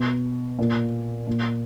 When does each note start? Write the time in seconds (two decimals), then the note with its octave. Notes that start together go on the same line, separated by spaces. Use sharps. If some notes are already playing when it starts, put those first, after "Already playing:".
Already playing: B2
0.59 A#2
1.27 A#2